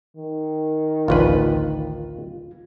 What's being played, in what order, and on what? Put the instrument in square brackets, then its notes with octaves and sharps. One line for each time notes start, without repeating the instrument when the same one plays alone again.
[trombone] D#3
[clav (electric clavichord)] A1 D2 B4 [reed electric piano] F4